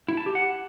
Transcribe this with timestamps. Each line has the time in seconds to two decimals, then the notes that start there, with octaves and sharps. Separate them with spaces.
0.08 E4
0.17 A5
0.26 G4
0.35 F#5